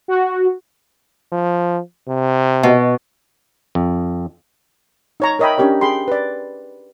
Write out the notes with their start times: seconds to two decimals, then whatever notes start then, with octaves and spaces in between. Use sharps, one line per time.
0.08 F#4
1.32 F3
2.08 C3
2.63 B2
3.75 F2
5.20 D#4 C#5 A#5
5.39 A#4 C#5 D#5 E5 G5 B5
5.58 C#4 D4 G4 A#4 C#5
5.81 G#4 G5 B5 C6
6.08 B4 D5